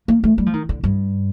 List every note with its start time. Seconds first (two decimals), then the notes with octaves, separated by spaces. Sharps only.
0.08 A#3
0.24 A3
0.38 G3
0.46 F3
0.53 D#3
0.69 D3
0.84 G2